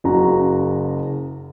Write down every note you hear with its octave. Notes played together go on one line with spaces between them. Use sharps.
F#1 C#3 F#4 A#5